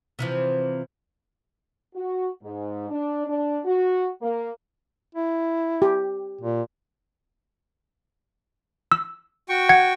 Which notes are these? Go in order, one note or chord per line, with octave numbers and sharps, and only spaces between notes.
C3 E3 F3
F#4
G#2
D4
D4
F#4
A#3
E4
G4
A#2
E6
F#4 G5 C#6
F#5 G#6 C#7